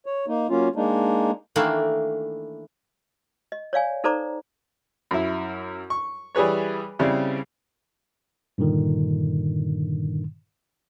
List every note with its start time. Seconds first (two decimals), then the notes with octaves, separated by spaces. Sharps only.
0.06 C#5
0.28 A#3 D#4
0.50 F#3 A#3 C#4 F4
0.76 G#3 A#3 D4 D#4
1.56 D#3 E3 A3 A#3 D4
3.52 D#5
3.73 C#5 D5 F5 G#5
4.04 D#4 A4 C5 D5 A#5 D6
5.11 F#2 E4
5.90 C#6
6.35 E3 G3 G#4 B4 C#5
6.99 C#3 G3 C4 C#4 E4
8.58 G2 A#2 D3 D#3